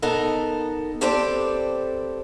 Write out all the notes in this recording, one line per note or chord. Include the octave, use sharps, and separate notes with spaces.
B3 D#4 A4 A#4
C4 G4 A4 B4 C5 D5